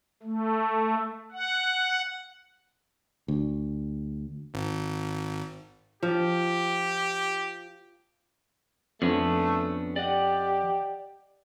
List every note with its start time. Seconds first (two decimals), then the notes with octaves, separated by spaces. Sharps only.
0.23 A3
1.32 F#5
3.28 D2
4.54 G#1
6.03 F3 G4
9.02 F2 A3 B3 C#4 D4
9.96 G4 D5 D#5 F#5